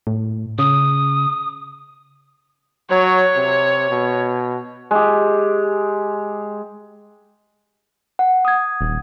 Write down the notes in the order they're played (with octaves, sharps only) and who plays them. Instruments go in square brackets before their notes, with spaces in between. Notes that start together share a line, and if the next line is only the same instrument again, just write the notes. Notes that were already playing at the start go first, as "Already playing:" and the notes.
[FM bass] A2
[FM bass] C#3 [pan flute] D#6
[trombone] F#3 [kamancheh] C#5
[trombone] C3
B2
[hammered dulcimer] G#3 G4
[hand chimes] F#5
D#6 G#6
[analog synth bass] D#1